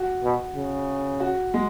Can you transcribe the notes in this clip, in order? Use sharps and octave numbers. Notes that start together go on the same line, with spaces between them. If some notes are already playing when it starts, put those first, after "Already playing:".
Already playing: F#4
B2
C#3
F#4
G#3